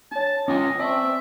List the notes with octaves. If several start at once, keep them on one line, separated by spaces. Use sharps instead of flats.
D4 C#5 A5
C#4 F4 D#5 G5 G#5 D6
C4 D5 E5 G#5 A5 C#6